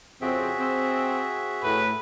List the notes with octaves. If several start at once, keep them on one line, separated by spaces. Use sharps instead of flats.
F2 C#3 C4 F#4 G#4 E5
C4
A2 B4